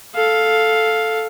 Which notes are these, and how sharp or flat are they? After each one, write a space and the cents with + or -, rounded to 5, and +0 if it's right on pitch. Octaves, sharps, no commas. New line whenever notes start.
A4 +0 F5 +5